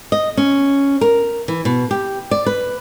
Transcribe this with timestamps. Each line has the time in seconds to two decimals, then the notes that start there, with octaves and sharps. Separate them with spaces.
0.12 D#5
0.37 C#4
1.01 A#4
1.48 E3
1.65 B2
1.91 G4
2.31 D5
2.46 B4